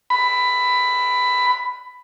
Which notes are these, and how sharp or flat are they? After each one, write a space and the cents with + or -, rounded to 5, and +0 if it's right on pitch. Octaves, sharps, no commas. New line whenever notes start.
B5 +15